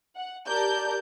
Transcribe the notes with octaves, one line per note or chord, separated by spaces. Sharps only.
F#5
G4 A#4 D5 A5 G6